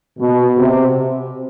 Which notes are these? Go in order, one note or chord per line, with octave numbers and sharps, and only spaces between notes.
B2
C3